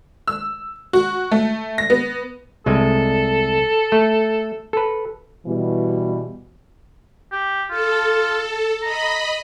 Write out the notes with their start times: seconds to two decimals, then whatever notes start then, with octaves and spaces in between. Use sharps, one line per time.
0.28 E6
0.93 F#4
1.32 A3
1.78 A#6
1.90 B3
2.66 C2 G#3 A4 D#5
3.92 A3
4.73 A4 B4
5.46 B2 E3 G3
7.32 G4
7.70 F4 A4
8.82 D#5 A#5 B5